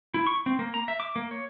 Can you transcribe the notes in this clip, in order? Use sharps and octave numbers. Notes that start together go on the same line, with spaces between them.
E4
C#6
C4
A#3
A#5
E5
D6
A#3
C#5